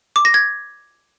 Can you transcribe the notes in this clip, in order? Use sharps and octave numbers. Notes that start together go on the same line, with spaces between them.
D6
A#6
G#6